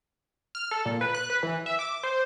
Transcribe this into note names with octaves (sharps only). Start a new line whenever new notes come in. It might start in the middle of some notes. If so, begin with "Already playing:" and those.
F6
A4
A#2
B4
F#6
B4
E3
E5
D6
C5